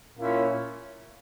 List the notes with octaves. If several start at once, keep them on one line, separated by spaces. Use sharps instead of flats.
A#2 A#3 C#4 E4